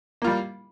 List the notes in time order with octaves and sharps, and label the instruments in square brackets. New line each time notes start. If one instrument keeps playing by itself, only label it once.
[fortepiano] A#3
F4
G3